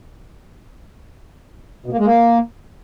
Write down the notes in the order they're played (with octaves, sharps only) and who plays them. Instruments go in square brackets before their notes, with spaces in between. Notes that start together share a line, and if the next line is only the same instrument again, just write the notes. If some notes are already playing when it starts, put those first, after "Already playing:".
[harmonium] B2
A#3
G#3
A#3